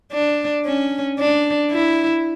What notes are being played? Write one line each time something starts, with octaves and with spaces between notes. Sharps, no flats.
D4
C#4
D4
E4